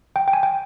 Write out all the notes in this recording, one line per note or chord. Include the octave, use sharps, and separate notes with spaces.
G5
G5
G#5
G5